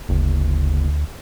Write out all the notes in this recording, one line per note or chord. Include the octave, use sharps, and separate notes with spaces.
F#1 D2